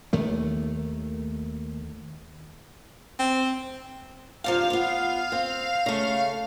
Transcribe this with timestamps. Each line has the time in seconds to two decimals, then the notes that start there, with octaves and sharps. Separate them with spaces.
0.13 D#2 D#3 A3
3.19 C4
4.44 G2 C3 F3 F5
4.70 B3 F4
5.32 C4
5.86 C#3 A3